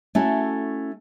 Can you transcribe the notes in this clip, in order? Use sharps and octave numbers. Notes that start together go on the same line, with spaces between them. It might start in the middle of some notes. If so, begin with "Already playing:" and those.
A3 C#4 E4 F#4 A4